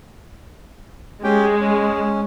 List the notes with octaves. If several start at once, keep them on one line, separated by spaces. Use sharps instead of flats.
G#3 C#4 G4 G5
C#4